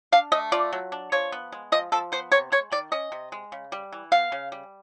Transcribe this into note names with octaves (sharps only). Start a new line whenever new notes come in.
D4 F5
A3 D#5
F4 D5
F#3
D4
F3 C#5
B3
G#3
F3 D#5
F3 A4
B3 C5
C3 C#5
G#3 C#5
D#3 D5
C#4 D#5
C3
G#3
C#3
G3
E3
B3 F5
C#3
G3